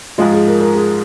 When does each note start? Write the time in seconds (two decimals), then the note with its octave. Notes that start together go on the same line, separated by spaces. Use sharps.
0.18 G#2 F3 G#3 F4
0.32 G#4
0.47 A#4
0.60 A#4
0.75 G#4